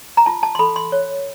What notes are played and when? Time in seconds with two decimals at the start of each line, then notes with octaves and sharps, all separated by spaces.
0.17 A#5
0.26 F4 A5
0.43 A5
0.55 C6
0.59 A4 B5
0.76 C6
0.92 C#5